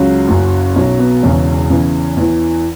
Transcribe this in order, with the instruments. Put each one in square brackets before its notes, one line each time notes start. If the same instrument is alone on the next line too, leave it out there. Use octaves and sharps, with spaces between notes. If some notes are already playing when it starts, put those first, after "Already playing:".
Already playing: [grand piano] C#2 C#3 F#3 C#4
F#1 F#2 F#3
B1 B2 F#3 C#4
B3
E1 E2 C#3 E3 C#4
E2 C#3 E3
E2 E3